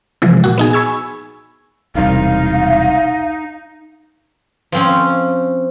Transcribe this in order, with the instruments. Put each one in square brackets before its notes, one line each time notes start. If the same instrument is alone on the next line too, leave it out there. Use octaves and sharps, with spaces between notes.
[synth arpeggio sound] C3 E3 F3 G#3
A#2 F#4
B3 D#4 G#4
G#5 B5 C#6 E6 G#6
[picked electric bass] E1 C2 [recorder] D#4 [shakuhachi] F5
[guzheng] F3 C4 C#4